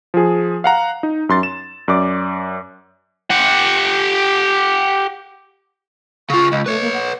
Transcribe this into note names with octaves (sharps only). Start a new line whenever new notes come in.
F3 G#4
F5 F#5 A#5
D#4
F#2 C6 A6
E7
F#2 D5 D6
G4 F#5
C#3 F4 C#6
C#2 D#5
A3 B4 C#5
A#3
F#5